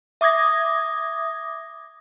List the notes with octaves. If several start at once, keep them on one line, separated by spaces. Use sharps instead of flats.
E5 D6 D#6 G#6 A#6